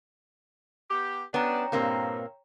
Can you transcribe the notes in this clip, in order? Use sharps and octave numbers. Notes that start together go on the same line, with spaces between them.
B3 G4
G3 B3 C#4 D4 C#5 G5 A#5
G2 A#2 A#3 C4